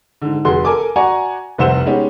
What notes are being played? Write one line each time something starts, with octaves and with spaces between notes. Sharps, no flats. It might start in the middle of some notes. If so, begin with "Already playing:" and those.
G#2 D3
F1 F#4 G#4 C6
A4 A#4 G#5 D6
F#4 D5 F#5 G#5 A#5 C#6
F1 C2 C3 C5 F#5 E7
G#3 B3 C#4 D#4 G4